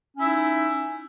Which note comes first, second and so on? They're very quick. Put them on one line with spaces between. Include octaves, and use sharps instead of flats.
C#4 E4 D#4